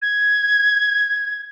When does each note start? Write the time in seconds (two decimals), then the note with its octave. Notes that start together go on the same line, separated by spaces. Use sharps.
0.02 G#6